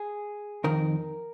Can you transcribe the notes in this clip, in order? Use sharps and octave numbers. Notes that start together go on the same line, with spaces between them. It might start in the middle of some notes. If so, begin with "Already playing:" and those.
Already playing: G#4
F2 D#3 A#4